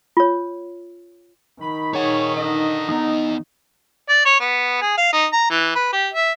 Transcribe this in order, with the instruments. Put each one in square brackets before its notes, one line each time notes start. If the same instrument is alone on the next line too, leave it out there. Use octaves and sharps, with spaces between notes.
[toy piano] F4 C#5
[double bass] D#3 [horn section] B5
[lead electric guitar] D#4 F#5 [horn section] G#4 C#5
[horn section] D3 D#5
[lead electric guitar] E2 B3 [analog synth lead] D#4
[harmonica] D5
C#5
B3
G#4
F5
D#4
A#5
E3
B4
G4
E5